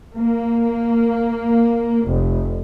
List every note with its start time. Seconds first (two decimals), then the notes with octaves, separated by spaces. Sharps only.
0.15 A#3
2.06 F1